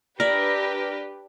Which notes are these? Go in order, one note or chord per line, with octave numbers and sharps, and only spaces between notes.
D4 G4 A#4 B4 D5 E5